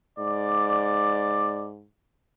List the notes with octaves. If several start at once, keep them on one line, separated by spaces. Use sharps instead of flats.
G#2 D5